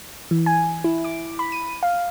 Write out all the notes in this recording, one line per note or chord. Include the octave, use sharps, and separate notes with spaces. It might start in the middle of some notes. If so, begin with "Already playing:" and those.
E3
G#5
E4
D6
B5
D#7
F5